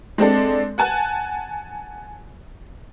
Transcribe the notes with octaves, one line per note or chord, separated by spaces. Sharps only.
G#3 C4 D4 A4
F#5 G#5 A5 F#6